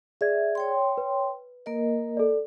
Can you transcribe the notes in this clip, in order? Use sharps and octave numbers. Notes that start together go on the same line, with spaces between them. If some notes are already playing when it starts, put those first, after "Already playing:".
G#4 D5 E5 G#6
C#5 G5 C6
B4
A#3 A#4 D#5
A4 D5